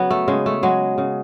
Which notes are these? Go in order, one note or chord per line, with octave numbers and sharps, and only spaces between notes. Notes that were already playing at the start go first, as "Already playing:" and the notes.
Already playing: C#3 F#3 B3
A3
C#3 G#3
A3
F#3 G#3
C#3